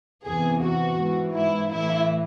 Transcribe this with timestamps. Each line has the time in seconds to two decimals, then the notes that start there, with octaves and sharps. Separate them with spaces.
0.24 E2 C3 E3 G#4
0.60 F#4
0.99 G#2 E3
1.35 E4
1.72 A2 E3 E4